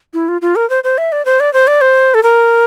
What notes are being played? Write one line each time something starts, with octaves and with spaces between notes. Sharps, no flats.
E4
F4
F4
A#4
C5
C5
E5
D5
C5
D5
C5
D5
C5
A4
A#4